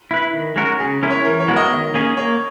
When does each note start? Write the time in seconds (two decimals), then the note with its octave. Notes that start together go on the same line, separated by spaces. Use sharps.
0.11 E4 B4
0.33 D#3
0.56 G#3 C#4 F#4 A#4
0.79 C#3 G#4
1.03 G#3 C#4 E4 A#4
1.10 C#5
1.25 E3 A#4
1.40 C#5
1.48 G#3 B3 F#4 A#4
1.56 D#5
1.71 D#3
1.94 A#3 C#4 G#4 C#5
2.17 A#3 C#5